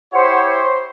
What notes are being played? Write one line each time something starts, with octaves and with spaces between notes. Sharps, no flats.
E4 G4 C5 C#5 F#5
C5